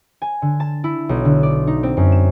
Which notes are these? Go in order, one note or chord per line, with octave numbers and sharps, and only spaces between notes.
G#5
D3
A5
E4
B1
D3
D5
D#4
C4
F#2
E7